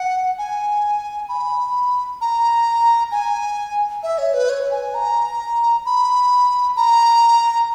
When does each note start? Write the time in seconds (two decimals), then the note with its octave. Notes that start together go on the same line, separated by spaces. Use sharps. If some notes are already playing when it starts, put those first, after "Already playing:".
Already playing: F#5
0.38 G#5
1.29 B5
2.21 A#5
3.11 G#5
4.03 E5
4.18 C#5
4.33 B4
4.49 C#5
4.71 G#5
4.94 A#5
5.85 B5
6.76 A#5